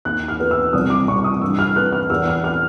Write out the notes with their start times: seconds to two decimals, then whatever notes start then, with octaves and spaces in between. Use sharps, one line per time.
0.05 D#2 F#6
0.28 F6
0.40 B3
0.51 E6
0.73 C2 D#6
0.90 D6
1.08 C2 C#6
1.24 D#6
1.42 G2 E6
1.59 F6
1.76 B3 F#6
1.93 F6
2.10 E2 E6
2.28 F6
2.44 F6